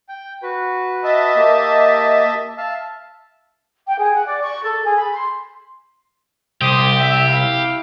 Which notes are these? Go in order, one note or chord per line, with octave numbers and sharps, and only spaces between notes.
G5
F#4 B4
D#5 E5 A5
A#3 G4
E5 F5 A5
G5
G#4
F#5
D5
C#6
A4
G#4
B5
C6
C2 G4 C5 D6 D#6
E5
E4 F5